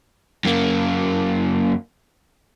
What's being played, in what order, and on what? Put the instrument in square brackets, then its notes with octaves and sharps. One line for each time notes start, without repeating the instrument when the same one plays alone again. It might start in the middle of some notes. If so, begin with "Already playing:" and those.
[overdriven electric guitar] F#2 A#3